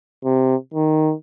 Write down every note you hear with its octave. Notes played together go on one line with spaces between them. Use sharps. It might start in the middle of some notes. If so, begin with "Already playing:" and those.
C3
D#3